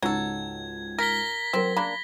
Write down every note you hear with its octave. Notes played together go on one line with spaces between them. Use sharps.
C#2 G#2 F#3 A4 G#6
A#4 A#6 B6 G7
F#3 C4 A#4
A#3 D4 B5